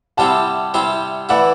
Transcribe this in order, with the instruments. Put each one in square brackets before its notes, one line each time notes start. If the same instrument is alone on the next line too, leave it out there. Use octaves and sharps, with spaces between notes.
[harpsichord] C3 G3 C4 E4 G4 [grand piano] F#5 A5
[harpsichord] C3 G3 C4 E4 G4
[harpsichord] E3 A3 E4 [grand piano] D5 F#5